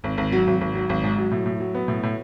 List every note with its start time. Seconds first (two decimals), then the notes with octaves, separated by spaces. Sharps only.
0.04 G#1
0.18 G#1
0.32 F#3
0.47 G#1
0.61 G#1
0.75 F#3
0.89 G#1
1.03 G#2
1.18 F#3
1.31 A2
1.46 A2
1.60 F#3
1.75 B3
1.88 A2
2.03 A2